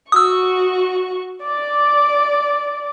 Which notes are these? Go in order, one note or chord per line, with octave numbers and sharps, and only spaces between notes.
F#4 C#6 D#6 E6
D5 D6